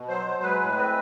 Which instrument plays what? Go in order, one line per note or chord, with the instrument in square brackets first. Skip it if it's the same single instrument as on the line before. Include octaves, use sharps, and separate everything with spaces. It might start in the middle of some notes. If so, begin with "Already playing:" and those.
Already playing: [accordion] B2
F#3 C5
F#3
G#3 B4
A2
C4